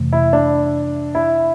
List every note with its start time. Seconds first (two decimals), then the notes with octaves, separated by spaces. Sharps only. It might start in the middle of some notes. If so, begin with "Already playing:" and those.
Already playing: F2 C3 E3 A3
0.13 E4
0.33 D4
1.15 E4